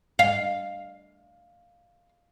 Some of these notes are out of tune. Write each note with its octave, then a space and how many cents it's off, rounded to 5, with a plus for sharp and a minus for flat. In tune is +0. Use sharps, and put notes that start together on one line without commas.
F5 +0